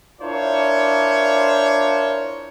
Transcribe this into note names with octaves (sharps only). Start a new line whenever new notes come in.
D4 E4 F4 A#4 C5 C#5